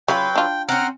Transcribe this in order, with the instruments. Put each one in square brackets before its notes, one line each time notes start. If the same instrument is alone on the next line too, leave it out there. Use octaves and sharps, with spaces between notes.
[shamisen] C#3 F4 [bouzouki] F#3 B4 [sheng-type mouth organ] G5
[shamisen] D4 F4
[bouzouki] C4 C#4 [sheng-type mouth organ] F#5 A#5 F6